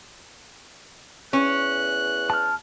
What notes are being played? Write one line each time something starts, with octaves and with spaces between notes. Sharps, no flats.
E2 C#4 F#6
A5 F6